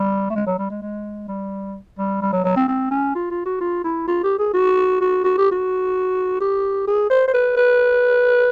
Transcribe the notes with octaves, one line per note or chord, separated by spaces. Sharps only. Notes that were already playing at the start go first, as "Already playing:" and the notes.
Already playing: G3
A3
G#3
F#3
G3
G#3
G#3
G3
G3
G3
F#3
F#3
C4
C4
C#4
F4
F4
F#4
F4
E4
F4
G4
G#4
F#4
F#4
F#4
G4
F#4
G4
G#4
C5
C5
B4
B4